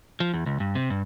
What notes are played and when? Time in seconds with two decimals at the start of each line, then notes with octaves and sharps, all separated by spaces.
0.20 F3
0.34 E2
0.46 C#2
0.60 G2
0.75 C3
0.90 G2